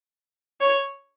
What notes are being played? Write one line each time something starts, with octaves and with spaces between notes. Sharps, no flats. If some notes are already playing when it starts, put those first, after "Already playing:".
C#5